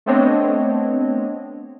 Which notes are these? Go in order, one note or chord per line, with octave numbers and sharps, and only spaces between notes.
A3 B3 C4 D4 C#5 D#5